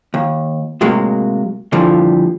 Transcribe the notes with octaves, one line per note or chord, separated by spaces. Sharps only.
D#2
A2 C3 F#3 G#3 A#3
A#2 D3 E3 F3 G3